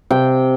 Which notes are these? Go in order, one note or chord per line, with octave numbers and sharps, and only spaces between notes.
C3 G5